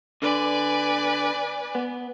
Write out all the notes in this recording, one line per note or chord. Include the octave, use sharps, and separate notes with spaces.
D3 B4 D5 G#5
B3